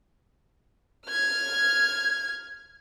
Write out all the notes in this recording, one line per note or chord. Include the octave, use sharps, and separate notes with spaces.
F6 G#6